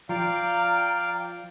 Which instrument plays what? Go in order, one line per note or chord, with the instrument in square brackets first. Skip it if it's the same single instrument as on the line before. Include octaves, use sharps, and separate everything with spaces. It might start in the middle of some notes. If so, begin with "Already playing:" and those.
[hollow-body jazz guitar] F3 [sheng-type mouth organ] D5 F5 G5 [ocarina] A#5